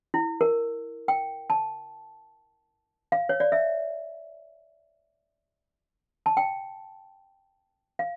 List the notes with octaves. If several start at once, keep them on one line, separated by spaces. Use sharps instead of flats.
E4
A#4
G5
A5
F5
C#5
D5
E5
A5
G5
F5